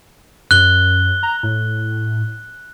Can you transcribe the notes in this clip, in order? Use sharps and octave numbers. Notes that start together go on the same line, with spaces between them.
F#2 F#6 G7
A#5
A2